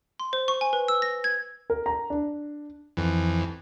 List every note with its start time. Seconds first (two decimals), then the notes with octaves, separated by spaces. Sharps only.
0.20 C6
0.33 C5
0.48 C#6
0.61 G#5
0.73 B4
0.88 E6
1.02 A#6
1.24 G#6
1.70 A#4
1.86 A#5
2.10 D4
2.97 F2 E3